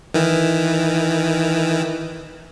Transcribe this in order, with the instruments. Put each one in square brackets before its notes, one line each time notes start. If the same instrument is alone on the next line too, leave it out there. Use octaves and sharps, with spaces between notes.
[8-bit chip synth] D#3 E3